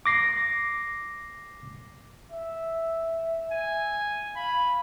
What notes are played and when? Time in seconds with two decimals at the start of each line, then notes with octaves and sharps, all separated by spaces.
0.06 D6 A#6 C7
2.32 E5
3.51 G#5
4.36 F5 B5